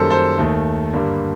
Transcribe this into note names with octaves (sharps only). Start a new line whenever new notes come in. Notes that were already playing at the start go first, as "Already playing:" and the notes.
Already playing: F#2 D#3 G3 A#3 A4 C5
A4 C5
D#2 D#3 A3
G2 D3 G3 A#3